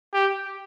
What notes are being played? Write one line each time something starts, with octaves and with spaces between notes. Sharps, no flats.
G4